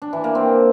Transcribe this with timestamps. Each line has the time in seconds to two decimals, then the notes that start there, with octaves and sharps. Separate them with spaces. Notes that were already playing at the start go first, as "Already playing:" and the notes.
0.02 D4
0.13 E3
0.24 A#3
0.35 C4